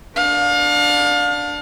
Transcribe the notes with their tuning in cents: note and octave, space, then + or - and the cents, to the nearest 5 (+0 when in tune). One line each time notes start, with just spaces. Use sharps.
D4 +0 F5 +35